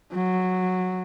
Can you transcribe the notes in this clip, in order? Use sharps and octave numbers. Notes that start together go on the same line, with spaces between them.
F#3